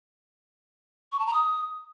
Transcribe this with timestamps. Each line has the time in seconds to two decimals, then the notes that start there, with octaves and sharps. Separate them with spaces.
1.12 C#6
1.19 A5
1.27 A#5
1.34 D#6